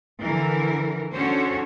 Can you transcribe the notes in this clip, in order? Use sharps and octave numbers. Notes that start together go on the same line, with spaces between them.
D3 E3 A#4
C#4 D4 F#4 A4 C5 C#5